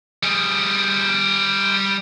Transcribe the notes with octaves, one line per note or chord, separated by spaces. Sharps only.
G3 G#4